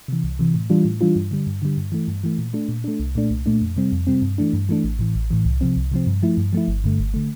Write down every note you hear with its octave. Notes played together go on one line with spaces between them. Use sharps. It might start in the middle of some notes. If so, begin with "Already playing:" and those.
C3 E3
C2
C3 E3
A2
E3 G3 D4 F4
A2
E3 G3 D4 F4
G2
D3 G3
G2
D3 G3
G2
E3 A3
G2
E3 A3
A#2
A3 D4
A#2
A3 D4
C2
A#2 A3 D4
C2
A#2 A3 D4
F2
C3 G3 C4
F2
C3 G3 C4
G2
E3 A3 D4
G2
E3 A3 D4
A1
A2 E3
A1
A2 E3
C2
C3 F3 C4
C2
C3 F3 C4
G2
F3 A3 E4
G2
F3 A3 E4
G1
G2 D3 A3
G1
D3 A3